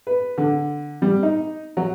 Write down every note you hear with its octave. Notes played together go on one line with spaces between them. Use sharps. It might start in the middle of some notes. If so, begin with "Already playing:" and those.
B4
D3
G3
D#4
F#3